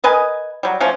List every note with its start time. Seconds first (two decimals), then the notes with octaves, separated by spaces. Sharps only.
0.04 A#4 B4 D#5 G#5
0.63 F#3 G3
0.80 F3 A3 C#4